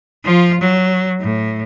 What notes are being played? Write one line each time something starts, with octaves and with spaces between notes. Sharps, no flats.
F3 F4
F#3
A2